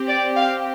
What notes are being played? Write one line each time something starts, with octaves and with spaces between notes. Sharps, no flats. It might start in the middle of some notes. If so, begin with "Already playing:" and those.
Already playing: C4 G4
D5
F5